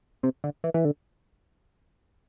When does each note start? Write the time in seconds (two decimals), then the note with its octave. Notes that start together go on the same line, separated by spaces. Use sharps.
0.23 C3
0.44 D3
0.64 E3
0.74 E3
0.85 D3